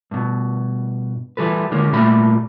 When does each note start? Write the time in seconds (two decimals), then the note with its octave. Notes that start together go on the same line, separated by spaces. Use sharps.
0.11 G2 B2
1.37 E3 G3 A4 B4
1.71 D#2 D3 G#3 A#3 C#4
1.92 A#2 G3 A3 A#3 B5